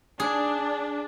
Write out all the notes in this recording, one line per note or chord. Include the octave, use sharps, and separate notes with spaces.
D4 G#4